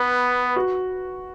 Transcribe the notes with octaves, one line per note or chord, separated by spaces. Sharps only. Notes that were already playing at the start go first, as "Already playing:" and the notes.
Already playing: B3 B4
F#4